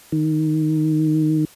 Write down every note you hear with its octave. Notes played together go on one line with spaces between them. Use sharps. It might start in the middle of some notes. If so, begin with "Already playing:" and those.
D#3